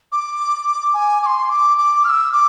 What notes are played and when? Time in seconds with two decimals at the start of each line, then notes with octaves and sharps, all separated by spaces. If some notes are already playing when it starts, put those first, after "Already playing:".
0.12 D6
0.94 G#5
1.22 D6
1.26 C6
1.49 D6
1.77 D6
2.04 F6
2.09 E6
2.32 D6